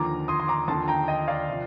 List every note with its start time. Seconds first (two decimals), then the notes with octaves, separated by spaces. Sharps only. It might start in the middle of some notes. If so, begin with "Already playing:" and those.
Already playing: D#2 D3 F3 A#5 D6
0.28 C6 D#6
0.40 C6
0.48 A#5 D6
0.68 D#2 D3 F3 A5 C6
0.88 G5 A#5
1.08 D#5 G5
1.28 D5 F5
1.49 C3 F3